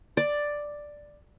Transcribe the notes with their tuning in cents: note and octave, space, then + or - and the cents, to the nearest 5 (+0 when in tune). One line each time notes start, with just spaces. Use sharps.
D5 +5